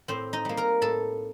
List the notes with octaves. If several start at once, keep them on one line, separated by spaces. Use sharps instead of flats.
A2 C4 C5
D#4 D#5
G3 A#3
A#4 A#5
A2 A4 A5